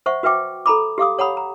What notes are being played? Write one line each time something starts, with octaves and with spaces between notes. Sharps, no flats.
C5 E5 F#5 C#6
F#4 B4 E5 G5 D6
A4 A#5 B5 D6
G4 F5 D6 D#6
C#5 F#5 A#5 B5 D#6
A#5